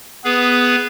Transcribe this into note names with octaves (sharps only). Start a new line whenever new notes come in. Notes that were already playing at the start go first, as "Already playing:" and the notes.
B3 G#4 B4